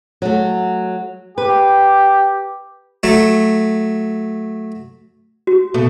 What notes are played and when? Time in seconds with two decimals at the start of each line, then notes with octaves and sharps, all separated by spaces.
0.22 F#3 A3
1.38 G4 B4
3.03 F#3 A3
5.47 F#4
5.74 B2 A3